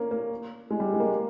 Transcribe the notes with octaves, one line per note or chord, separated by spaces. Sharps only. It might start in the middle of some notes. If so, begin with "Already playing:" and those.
Already playing: A#3 C#4
A#3
G#3
G3
G#3
A#3